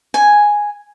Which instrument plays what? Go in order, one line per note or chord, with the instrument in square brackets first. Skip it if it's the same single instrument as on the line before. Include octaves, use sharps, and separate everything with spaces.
[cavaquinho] G#5